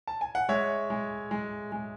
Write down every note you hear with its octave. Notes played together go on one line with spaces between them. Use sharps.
A5
G#5
F#5
G#3 C#5 E5
G#3
G#3
G#3